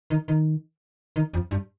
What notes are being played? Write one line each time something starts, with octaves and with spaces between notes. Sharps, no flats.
D#3
D#3
D#3
F2
G2